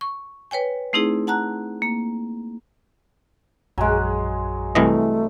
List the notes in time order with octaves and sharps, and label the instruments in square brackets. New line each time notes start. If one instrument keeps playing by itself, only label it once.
[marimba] C#6
B4 C#5 G5 G#5
A3 C4 D#4 E4 G#4
F#5 A5 A#5 F#6
A#3
[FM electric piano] A#1 F#2 G#5 [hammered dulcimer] F#3 G#3
[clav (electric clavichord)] C2 E3 D#5 [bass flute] A3